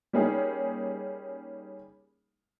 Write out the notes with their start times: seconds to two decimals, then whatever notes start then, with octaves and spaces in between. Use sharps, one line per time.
0.13 G3 A#3 C#4 D#4 G#4